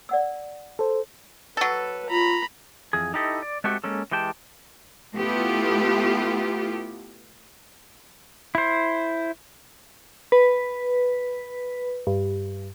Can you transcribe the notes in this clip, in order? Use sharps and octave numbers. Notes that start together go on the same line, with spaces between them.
D5 F#5 E6
A4 C5
F#3 A4 B4
F4 A#5 B5
F2 E3 G#4
D#4 E4 G4 A4 D#5
D5
G#3 A3 C4 F#4 G4
G#3 A#3 C#4 A4
E3 G#3 G4 G5 A5
A3 B3 E4 F4 G4
E4 C5
B4
G2